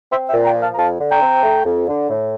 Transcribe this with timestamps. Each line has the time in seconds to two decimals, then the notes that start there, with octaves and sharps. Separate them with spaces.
0.11 C4 C5 E5
0.28 E5 G5
0.33 A#2
0.45 G5 A#5
0.55 F3
0.61 F5 A5
0.73 A#5
0.77 F2 F5 A5
0.99 D3
1.10 G5 A#5
1.21 C4
1.43 A3
1.66 F2
1.88 D3
2.09 A2